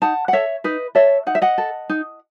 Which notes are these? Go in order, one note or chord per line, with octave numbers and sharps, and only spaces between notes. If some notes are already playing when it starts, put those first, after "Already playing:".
D#4 F#5 A5
F#5
A4 C#5 E5
D#4 B4 D#5
A4 C#5 E5
D#4 F#5
E5
D#5 F#5
A4
D#4